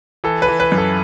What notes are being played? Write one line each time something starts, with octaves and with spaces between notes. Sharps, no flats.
E3 A4
B4
E3
B4
F#2
A4